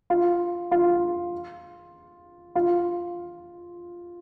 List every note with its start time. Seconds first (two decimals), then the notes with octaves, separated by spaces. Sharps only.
0.10 F4
0.71 F4
2.55 F4